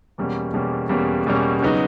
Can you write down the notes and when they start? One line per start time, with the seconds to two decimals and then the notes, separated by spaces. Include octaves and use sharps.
0.18 E2 B2 G3 A#3 C#4
0.54 E2 B2 G3 A#3 C#4
0.89 E2 B2 G3 A#3 C#4
1.26 E2 B2 G3 A#3 C#4
1.61 C#3 F#3 B3 D#4 F#4